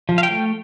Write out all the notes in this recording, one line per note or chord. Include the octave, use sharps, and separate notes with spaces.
F3
F5
G5
A3